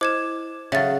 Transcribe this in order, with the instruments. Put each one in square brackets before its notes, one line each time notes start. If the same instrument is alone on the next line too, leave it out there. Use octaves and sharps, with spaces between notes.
[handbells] E4 C5 D#5 [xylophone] D6 G#6 E7
[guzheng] C#3 F#3 [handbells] G#4 C#5 [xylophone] E5 A6